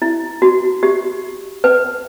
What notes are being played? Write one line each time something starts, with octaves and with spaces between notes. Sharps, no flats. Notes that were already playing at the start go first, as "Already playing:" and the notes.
E4
F#4
G4
B4